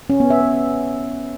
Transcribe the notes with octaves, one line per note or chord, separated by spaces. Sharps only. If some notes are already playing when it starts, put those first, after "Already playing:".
C#4
B3
E5
B3